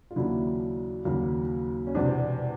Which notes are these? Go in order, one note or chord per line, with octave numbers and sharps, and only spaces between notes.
F4
D#2 C#3 F#3 A#3 D4 E4
D#2 C#3 F#3 A#3
C#4
E1 E2 C3 C4 D4